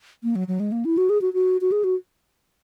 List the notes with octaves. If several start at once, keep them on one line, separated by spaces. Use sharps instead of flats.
A#3
F#3
F#3
G#3
A#3
E4
F#4
G#4
F#4
F#4
F#4
G#4
F#4